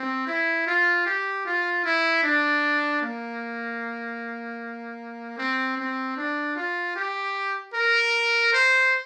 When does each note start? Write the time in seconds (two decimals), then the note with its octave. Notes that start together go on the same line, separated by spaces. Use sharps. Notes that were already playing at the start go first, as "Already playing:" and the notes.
Already playing: C4
0.27 E4
0.67 F4
1.06 G4
1.45 F4
1.85 E4
2.23 D4
3.02 A#3
5.38 C4
5.77 C4
6.17 D4
6.56 F4
6.96 G4
7.74 A#4
8.53 C5